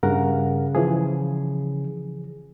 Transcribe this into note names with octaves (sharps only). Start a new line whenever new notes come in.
G2 C#3 A#4 F#5
E3 F3 G#4